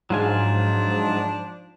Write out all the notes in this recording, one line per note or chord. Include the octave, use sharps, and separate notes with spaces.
G#2 F3 F#3 D4 F4 G#5